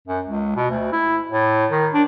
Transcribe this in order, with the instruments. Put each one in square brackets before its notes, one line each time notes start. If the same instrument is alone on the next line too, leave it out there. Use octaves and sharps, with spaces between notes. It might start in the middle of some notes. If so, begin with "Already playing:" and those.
[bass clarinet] F#2
C#2
B2
D2
E4
A2
D#3
D4